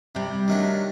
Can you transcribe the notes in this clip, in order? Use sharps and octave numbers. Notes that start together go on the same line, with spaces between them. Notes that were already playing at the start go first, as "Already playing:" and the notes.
C3 G3
D#3 F#3 A3 D4